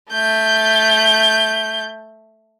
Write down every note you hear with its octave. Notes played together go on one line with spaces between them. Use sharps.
A3 G6